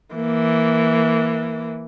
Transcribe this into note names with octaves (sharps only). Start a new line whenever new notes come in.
E3 A#3